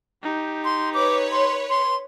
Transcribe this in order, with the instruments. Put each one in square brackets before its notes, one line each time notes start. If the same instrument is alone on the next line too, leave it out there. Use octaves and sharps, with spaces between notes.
[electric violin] D#4 G4
[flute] C6
[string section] B4 C#5 [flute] D6
[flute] C6
C6